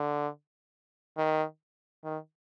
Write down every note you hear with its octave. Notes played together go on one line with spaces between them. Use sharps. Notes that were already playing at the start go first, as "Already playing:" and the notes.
Already playing: D3
D#3
D#3